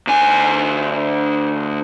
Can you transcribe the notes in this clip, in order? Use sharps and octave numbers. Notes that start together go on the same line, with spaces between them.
D2 G#5